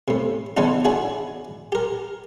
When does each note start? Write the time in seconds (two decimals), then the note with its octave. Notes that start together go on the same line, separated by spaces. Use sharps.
0.08 A2 C3
0.57 C#3 E3 B3 D4 D#4 F4
0.85 D4 E4 F#4 G#4 C#5
1.72 G4 A#4